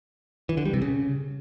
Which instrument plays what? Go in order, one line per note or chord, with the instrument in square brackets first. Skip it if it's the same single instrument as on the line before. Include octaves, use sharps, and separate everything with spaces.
[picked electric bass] E3
D3
G3
C3
C#3